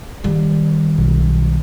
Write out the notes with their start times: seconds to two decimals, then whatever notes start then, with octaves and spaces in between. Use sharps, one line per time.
0.24 D#3 G3
0.98 B1